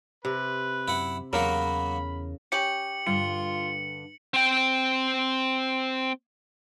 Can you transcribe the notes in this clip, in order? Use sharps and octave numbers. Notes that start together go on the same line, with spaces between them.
C3 B4
F#2 E4 F#5
E2 C#3 F#3 A#3 F#4 A#4 B5
C#4 G4 C#7 F#7
G2 D3 F4 C#7
C4 G5